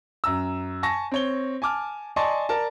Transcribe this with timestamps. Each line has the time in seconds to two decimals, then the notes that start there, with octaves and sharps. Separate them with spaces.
0.24 F#2 A#5 E6
0.83 G#5 A5 C#6 A#6
1.12 C4 C#5 G7
1.62 G#5 A5 D6 F6
2.16 D5 D#5 G#5 A5 C6 C#6
2.49 A#4 D5 A5